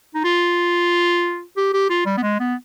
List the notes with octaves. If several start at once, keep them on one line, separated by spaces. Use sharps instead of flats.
D#4
F4
G4
G4
F4
G3
B3
G#3
B3